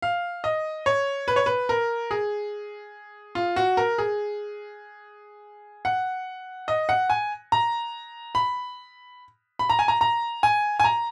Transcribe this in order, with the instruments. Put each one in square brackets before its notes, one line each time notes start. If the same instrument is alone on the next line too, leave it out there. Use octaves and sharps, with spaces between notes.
[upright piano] F5
D#5
C#5
B4
C#5
B4
A#4
G#4
F4
F#4
A#4
G#4
F#5
D#5
F#5
G#5
A#5
B5
B5
A#5
G#5
A#5
A#5
G#5
G#5
A#5